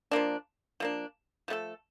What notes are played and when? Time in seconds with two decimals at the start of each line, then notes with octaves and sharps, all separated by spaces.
0.11 F3 A#3 D4
0.80 F3 A#3 D4
1.48 F3 A3 D#4 A4